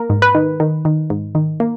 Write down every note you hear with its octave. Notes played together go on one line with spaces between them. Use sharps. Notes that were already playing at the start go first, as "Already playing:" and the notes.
Already playing: A#3 A#4
G#2
B4
D#3
D#3
D#3
G#2
D#3
A#3